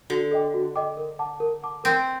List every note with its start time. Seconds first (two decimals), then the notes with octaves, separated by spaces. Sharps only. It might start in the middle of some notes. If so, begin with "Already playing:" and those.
0.10 D3 F#4
0.31 A4 D#5 G5 D6
0.54 F#4
0.76 A4 D#5 G5 D6
0.97 A#4
1.19 F#5 A5 D6
1.40 A#4
1.63 F#5 A5 D6
1.84 C4 A#4